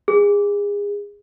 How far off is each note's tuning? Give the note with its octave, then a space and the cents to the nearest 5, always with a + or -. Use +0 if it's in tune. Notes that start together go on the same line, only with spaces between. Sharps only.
G#4 -30